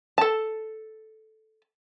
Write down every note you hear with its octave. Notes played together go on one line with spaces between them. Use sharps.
A4 A5